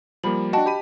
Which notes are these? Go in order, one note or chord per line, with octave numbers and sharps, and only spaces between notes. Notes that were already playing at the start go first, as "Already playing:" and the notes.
F3 G3 A#3 B5 F#7
D4 F#4 D#5 G5 A5
G4 B5 D#7